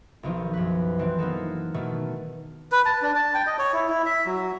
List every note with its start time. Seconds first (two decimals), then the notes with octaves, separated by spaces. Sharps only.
0.23 B1 D#3 F3
0.53 F#2 B4
0.98 D#3 E3 C4
1.19 A#3 B3 D#4 A4
1.74 B2 D#3 A3
2.72 B4
2.86 A5
3.02 D4
3.15 A5
3.34 G5
3.47 D#5
3.59 C#5
3.73 E4
3.89 E4
4.06 E5
4.26 F#3